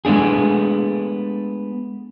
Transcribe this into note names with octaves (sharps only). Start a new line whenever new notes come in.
G#3 A3 B3 D4 G#4